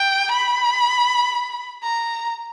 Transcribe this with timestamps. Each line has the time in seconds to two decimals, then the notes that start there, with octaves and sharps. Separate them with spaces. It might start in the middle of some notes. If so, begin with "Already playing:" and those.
Already playing: G5
0.31 B5
1.83 A#5